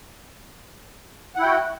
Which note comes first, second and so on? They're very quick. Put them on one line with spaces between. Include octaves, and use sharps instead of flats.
F#5 E4 G5 F#4